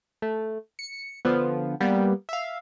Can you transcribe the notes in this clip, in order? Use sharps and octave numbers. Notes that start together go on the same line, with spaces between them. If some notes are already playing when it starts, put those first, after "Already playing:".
A3
C#7
D3 F3 B3
G3 A#3 B3
E5 F5